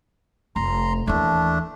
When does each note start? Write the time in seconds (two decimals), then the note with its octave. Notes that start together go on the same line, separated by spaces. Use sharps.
0.56 F1 A#5 C6
1.07 D#2 E3 A3 D4